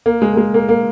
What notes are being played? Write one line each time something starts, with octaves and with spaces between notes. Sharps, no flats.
A#3
G#3
A#3
G#3
A#3
A#3